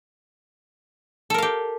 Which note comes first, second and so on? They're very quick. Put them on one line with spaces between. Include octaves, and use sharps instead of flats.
A4 A#4 F5 G4